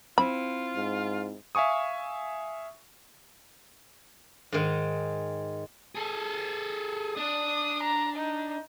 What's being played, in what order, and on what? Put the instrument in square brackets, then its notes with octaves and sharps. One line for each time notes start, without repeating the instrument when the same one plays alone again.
[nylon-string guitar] C4 E4 [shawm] F4 [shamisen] B5
[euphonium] G#2
[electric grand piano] E5 F5 G#5 C#6 D#6
[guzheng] G#2 D#3
[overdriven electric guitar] G#4 A4
[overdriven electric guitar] D4 [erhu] D#6
[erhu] A#5
D#4